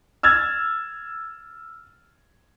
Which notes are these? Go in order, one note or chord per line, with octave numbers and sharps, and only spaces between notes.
E6 F6 G#6 A6